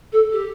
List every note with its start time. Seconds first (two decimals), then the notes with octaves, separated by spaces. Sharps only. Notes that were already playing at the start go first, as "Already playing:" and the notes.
0.12 A4
0.32 G4